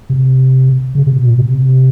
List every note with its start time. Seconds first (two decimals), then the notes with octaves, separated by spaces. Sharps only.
0.10 C3
0.95 C#3
1.07 C3
1.17 B2
1.27 A#2
1.38 C3
1.45 B2
1.53 C3